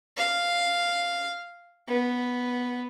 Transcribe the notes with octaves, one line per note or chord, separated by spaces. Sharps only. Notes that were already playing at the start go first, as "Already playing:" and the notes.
F5
B3